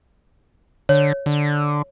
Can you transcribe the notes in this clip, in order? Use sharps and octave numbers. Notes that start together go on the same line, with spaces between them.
D3 C#5
D3